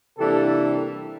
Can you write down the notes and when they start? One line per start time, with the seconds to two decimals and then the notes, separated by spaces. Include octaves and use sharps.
0.18 C3 E3 G3 A#3 D4 G4 A4